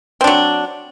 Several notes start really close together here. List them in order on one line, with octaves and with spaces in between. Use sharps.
C4 D4 F#3